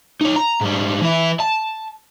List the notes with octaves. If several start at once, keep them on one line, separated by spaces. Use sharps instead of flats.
D#4 C#5
A#5
G#2 G3
E3 E4
A5